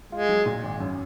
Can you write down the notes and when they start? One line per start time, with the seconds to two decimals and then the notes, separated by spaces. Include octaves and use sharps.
0.12 G#3 F4
0.29 F#3
0.46 A#2
0.63 G#1
0.80 F#2